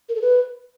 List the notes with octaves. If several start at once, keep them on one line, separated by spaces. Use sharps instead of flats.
A#4
A4
B4